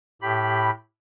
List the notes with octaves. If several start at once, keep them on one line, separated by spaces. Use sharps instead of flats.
A2 G4 B5